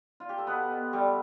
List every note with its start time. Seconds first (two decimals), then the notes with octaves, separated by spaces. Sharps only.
0.20 F4
0.29 G4
0.38 A4
0.47 B2 B3 B4
0.71 B2
0.93 G3 A3 G4